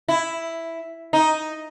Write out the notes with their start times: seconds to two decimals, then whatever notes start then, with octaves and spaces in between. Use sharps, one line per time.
0.08 E4
1.13 D#4